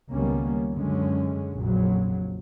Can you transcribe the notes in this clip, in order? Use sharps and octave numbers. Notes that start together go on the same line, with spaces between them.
C#2 D#3 G3 A#3 B3 C#4
F#2 D3 G#3 C#4
A#1 F2 C#3 F#3